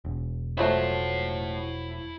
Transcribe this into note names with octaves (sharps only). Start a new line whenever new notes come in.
E1
F3 F#3 A3 E4 A5